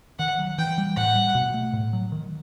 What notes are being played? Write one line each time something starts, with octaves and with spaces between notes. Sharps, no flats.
D#3 F#5
F#3
E3 G5
G3
A2 F#5
G3
B2
A3
A2
F#3
D#3